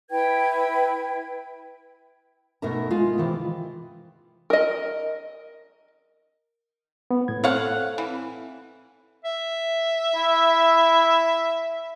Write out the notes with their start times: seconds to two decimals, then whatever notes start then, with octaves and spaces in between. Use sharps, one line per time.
0.10 E4 B4 G5 G#6
2.62 B2 A3 D#4 A#4 E5 A#5
2.91 G#3 F4
3.18 C3 D#3 E3
4.50 A#4 D#5
7.11 B3
7.28 A2 G#6
7.44 C4 A4 C#5 F5 F#5
7.98 E3
9.24 E5
10.15 E4